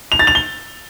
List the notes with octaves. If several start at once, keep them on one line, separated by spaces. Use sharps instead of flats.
F7
A6
F7
G7